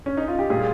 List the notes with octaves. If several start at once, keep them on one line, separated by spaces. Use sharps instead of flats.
C#4
D#4
F4
G4
A#2 G3 F4 G#4